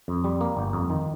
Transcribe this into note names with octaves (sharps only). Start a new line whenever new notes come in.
F2
G3
A#3
G1
F2
D#3